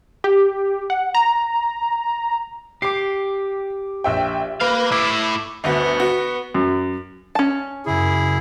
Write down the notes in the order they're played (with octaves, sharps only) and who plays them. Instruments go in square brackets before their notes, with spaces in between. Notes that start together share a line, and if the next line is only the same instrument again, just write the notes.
[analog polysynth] G4
F#5
A#5
[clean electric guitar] G4 [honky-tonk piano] D6 C7
[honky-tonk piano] A#1 E5 G5
[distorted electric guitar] A#3 F5 [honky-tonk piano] B4
[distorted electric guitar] A2 E4 [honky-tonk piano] D6 E7
[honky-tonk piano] G1 D2 F#4 [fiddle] B3
[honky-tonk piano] F#4
[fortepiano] F#2
[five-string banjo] C#4 A5
[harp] F#2 C#3 [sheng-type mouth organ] E4 G#4